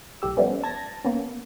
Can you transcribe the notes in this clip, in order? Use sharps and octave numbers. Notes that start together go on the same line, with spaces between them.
B1 A2 G4 E6
F3 G3 A3 B3 C#4
A5 G#6 A#6
A#3 B3 C#4